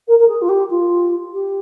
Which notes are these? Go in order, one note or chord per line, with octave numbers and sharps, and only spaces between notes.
A#4
A#4
G#4
F4
G4
F4
G4